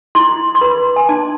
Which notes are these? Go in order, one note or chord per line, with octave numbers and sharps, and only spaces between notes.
E4 C6
C6
B4 B5
G#5
D4 A5